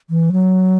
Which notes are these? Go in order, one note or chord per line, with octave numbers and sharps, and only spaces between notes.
E3
F#3